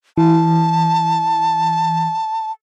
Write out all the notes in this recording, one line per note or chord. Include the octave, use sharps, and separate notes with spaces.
E3 A5